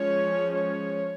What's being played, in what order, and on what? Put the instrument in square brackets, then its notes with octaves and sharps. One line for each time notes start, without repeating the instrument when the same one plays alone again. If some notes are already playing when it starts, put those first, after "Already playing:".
Already playing: [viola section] F3 G#3 C#4 C#5
C#5